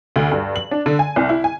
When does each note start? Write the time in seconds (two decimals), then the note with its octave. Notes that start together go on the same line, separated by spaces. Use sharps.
0.16 D2
0.32 G2
0.56 F#7
0.71 D4
0.86 D3
0.99 G#5
1.16 C2
1.29 E4
1.44 G#5